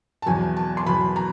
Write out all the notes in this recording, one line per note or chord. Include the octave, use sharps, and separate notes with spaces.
A5
E2 B2 F#3 G#5
A5
C6
E2 B2 F#3 B5
A#5